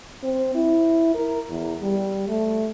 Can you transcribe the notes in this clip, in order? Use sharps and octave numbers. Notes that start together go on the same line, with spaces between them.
C4
E4
A#4
E2
G3
A3